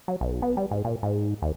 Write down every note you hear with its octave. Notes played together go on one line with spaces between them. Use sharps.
F#3
B1
B3
G3
G#2
A#2
G#2
D#2